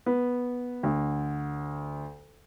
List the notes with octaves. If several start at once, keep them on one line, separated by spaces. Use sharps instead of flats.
B3
D2